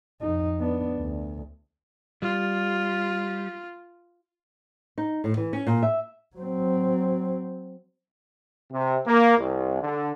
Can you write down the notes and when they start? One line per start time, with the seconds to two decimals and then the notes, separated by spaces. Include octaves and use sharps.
0.21 F2 D#4
0.60 B3 D4
0.99 D2
2.22 G3 F4
4.98 D#4
5.24 A2
5.37 E3
5.53 C#4
5.67 A#2
5.83 E5
6.36 F#3 C4
8.72 C3
9.07 A#3
9.39 C2
9.82 D3